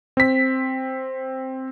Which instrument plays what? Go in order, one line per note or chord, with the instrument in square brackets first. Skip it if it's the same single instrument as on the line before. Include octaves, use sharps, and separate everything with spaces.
[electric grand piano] C4 B6